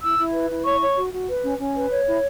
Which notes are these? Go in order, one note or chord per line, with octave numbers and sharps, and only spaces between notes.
E4 E6
E4
B4
E4
C#5 C#6
C#5
F#4
F#4
B4
C#4
C#4
B4
C#5
E4